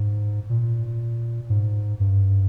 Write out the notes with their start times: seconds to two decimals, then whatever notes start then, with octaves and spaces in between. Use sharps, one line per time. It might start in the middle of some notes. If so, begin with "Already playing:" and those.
Already playing: G#2
0.50 A#2
1.49 G#2
2.00 G2